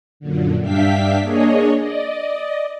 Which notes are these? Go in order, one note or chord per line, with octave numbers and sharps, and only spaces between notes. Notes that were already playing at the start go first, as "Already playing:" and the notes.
F#2 A#2 D3
G2 D4 E5 F5 G5 B6
A#3 D4 G#4 C#5 D#5
D5 D#5